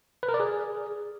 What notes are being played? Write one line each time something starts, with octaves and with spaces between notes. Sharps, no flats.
B4
A#4
D5
G#4